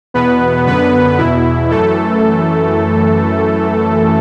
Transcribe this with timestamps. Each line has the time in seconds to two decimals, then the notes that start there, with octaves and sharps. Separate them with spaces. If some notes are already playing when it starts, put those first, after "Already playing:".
0.14 E2 B2 B3 B4
0.67 F#2 D3 B3 B4
1.18 E2 B2 E4
1.71 F#2 E3 A3 A4